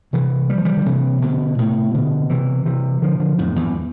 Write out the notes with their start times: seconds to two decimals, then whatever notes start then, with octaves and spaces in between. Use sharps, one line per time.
0.13 C3 E3
0.50 G3
0.58 F3
0.65 E3 G3
0.77 D3
0.86 C3 E3
1.22 B2 D3
1.58 A2 C3
1.93 B2 D3
2.29 C3 E3
2.65 C3 E3
3.02 D3 F3
3.20 D3 F3
3.38 F2 A2
3.56 E2 G2